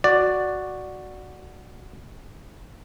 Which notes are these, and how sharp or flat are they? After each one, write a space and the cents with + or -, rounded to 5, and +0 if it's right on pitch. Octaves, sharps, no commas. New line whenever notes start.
F#4 +0 D5 +5